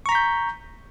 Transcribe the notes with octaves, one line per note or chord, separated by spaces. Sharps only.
A#5 C#6 G6 B6